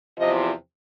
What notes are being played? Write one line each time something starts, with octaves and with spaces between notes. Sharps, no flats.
E2 C3 F3 D#5